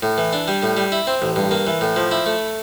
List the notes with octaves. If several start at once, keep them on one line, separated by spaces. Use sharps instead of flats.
A2
E3
D4
G3
A2
G3
E4
C4
A1
G2
A#3
E3
A2
F3
E4
A3